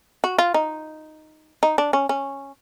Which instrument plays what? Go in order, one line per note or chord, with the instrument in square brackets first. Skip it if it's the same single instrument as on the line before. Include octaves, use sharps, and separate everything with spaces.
[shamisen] F#4
F4
D#4
D#4
D4
C#4
C#4